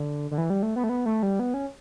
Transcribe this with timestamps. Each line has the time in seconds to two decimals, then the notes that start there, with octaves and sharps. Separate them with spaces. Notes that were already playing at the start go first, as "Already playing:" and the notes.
Already playing: D3
0.31 D3
0.38 E3
0.50 G3
0.63 A3
0.76 B3
0.84 A3
0.89 B3
1.06 A3
1.23 G3
1.39 B3
1.54 C#4